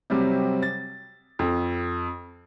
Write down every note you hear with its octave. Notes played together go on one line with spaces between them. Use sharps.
C3 F#3 G3 C4
A6
F2